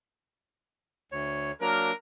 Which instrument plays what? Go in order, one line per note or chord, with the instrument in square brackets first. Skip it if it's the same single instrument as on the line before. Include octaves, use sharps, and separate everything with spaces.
[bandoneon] D2 C#5
[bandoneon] F#3 A#3 D4 [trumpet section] A#4